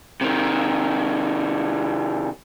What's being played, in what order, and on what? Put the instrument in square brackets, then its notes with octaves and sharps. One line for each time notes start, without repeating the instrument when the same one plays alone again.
[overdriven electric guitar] C3 D#3